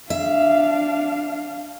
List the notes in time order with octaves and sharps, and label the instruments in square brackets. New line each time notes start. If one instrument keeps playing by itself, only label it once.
[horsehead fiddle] D4 F5 [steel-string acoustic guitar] E5